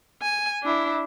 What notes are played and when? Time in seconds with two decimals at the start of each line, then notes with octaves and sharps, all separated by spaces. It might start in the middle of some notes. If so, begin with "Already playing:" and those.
0.22 G#5
0.63 D4 E4